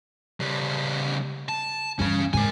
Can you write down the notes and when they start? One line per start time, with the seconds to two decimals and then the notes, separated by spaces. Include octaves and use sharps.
0.40 C#3 G3
1.49 A5
1.99 G2 E3 C#4 F5
2.34 G#2 A#4 G#5